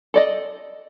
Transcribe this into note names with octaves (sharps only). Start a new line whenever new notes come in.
A4 D5 D#5